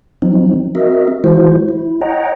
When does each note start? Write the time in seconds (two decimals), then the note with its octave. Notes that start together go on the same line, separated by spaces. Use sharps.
0.22 F3 F#3 C4 D#4
0.75 C4 F#4 A#4 D#5 E5
1.24 E3 G#3 E4 F#4 C5
1.69 E4
2.01 C#5 D#5 F#5 G5 A#5